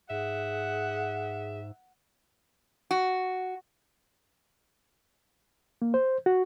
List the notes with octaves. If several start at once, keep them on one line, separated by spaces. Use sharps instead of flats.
G#2 G#4 E5 F#5
F#4
A#3
C5
F#4